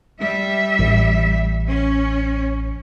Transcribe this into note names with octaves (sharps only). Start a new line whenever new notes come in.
G3 E5
A1
C#4